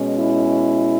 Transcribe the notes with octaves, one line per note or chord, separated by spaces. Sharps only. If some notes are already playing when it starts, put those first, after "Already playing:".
Already playing: B2 G#3 C#4
E4